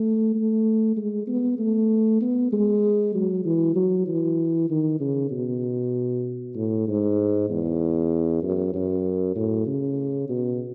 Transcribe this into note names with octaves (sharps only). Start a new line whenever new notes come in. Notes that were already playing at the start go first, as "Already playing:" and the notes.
Already playing: A3
A3
G#3
B3
A3
B3
G#3
F#3
E3
F#3
E3
D#3
C#3
B2
A2
G#2
E2
F#2
F#2
A2
C#3
B2